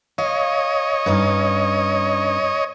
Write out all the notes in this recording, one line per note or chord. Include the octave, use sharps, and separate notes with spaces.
C#5 D#5 F5
G2 C#4 D#4